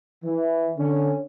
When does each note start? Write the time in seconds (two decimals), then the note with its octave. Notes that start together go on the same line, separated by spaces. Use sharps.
0.23 E3
0.76 D3 C#4